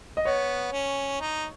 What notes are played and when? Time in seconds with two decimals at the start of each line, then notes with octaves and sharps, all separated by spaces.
0.17 D#5
0.25 B3 C#5
0.72 C#4
1.20 D#4